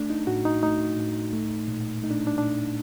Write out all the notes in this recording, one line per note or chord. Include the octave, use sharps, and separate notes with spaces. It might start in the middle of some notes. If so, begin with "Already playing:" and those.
Already playing: A3 D4
D#4
A2 F#4
D#4
A3 D#4
A2
A3
A#2
A3 D#4
D4
D4
A#2 D4